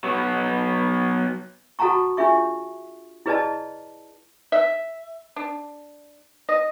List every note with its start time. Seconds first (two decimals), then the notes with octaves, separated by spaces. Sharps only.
0.04 F#3 B3
1.79 F#4 A4 F#5 A5 A#5 C#6
2.17 D4 F4 G#4 E5 C#6
3.26 E4 G#4 B4 D5 D#5 A5
4.52 E5
5.36 D4
6.49 D#5